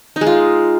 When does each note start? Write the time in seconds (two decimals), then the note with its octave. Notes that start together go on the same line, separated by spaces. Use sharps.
0.16 D#4
0.21 G#3
0.27 F4